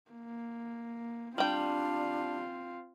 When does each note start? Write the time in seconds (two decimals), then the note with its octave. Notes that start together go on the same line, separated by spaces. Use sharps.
0.11 A#3
1.38 G3 C4 D4 F4 G5